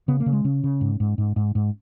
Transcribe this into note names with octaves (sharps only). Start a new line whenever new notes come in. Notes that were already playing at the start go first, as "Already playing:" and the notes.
C#3 B3
A#3
C#3
G#3
C#3 C#4
C#3
G#2
G#2
G#2
G#2
G#2